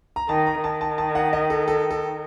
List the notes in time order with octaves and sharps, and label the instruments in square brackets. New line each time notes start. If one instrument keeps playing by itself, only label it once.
[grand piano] A#5
[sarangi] D#3 [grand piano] A5
[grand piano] A#5
[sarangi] D#3 [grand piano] A5
[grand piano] A5
A5
F#5
D#5
A4
A4
A4